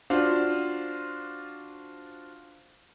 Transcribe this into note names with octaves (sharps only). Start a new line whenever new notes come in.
D4 F4 F#4 C5